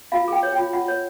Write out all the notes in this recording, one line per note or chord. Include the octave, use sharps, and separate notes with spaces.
F4 F5
G#4 G5
C#5
G5
F4
F4 F#5
C#5